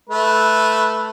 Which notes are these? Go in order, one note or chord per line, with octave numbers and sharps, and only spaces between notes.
A3 B4